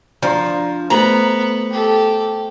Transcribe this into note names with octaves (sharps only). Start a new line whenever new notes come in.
F3 D4 A#5 C6
A3 B3 C5 A#5
G4 A4